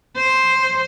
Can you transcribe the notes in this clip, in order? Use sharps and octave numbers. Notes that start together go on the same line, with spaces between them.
C5